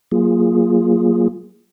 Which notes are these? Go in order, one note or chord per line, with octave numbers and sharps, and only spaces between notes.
F#3 A#3 F4 G#4